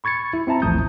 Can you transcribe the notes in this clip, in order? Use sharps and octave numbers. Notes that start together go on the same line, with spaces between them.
B5 C#6 G#6 A6 C#7
E4
C4 E4 E5 A5 A#5
A1 D#2 F3 A3 D#6 G6